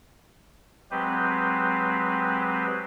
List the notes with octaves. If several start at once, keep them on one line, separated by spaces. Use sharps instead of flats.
F#3 G#3 C4 G4 B4 C5